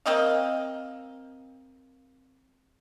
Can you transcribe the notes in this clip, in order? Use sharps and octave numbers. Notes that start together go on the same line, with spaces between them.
A#3 C4 D#5 F5